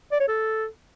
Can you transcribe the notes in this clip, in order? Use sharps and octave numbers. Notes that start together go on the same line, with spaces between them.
D5
C#5
A4